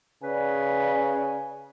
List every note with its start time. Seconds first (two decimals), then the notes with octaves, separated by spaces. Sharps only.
0.23 C#3 B4 D5 G#5